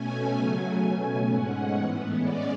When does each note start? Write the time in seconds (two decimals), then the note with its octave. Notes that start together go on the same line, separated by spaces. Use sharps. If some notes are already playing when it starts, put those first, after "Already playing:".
Already playing: B2 A3 C#4 G#5
0.35 C#3 F#3 A3 C#4
0.82 B2 A3 C#4
1.29 G#2 G#3 C#4 F#5
1.76 A2 E3 B3
2.23 G#3 C#4 D5